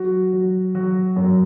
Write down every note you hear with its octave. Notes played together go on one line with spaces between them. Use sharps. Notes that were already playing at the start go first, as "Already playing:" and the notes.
Already playing: F#3 F#4
F#3
F#3 F#4
F#2